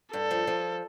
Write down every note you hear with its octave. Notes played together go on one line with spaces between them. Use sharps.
G2 A4
F3
F3